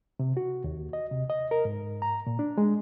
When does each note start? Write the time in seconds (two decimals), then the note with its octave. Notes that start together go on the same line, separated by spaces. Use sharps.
0.20 C3
0.37 F#4
0.64 D#2
0.93 D#5
1.11 C3
1.30 D#5
1.51 A#4
1.65 G#2
2.02 A#5
2.27 A#2
2.39 D4
2.58 G#3